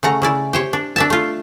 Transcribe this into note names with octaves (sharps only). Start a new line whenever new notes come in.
C#3 A3 F#5 A#5
C#3 E4 D5
G4 C5 C#5
D4
D4 E5 A5
A3 F4